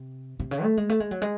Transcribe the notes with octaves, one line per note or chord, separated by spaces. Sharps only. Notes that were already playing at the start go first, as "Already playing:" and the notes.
Already playing: C3
C3
C#3
A3
G#3
A3
G#3
F#3
G#3